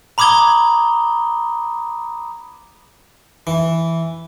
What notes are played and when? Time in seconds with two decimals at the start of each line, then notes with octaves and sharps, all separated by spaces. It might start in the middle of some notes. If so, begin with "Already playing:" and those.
0.18 A#5 B5 D6 D#6 G#6 G7
3.47 E3